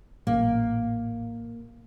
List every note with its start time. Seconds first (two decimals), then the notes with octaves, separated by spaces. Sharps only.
0.27 A1 A#2 A#3